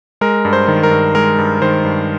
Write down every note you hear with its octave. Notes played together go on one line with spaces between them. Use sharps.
G#3 A#4
G2
C5
D#3
A#4
G2
G#3 A#4
G2
D#3 C5
G2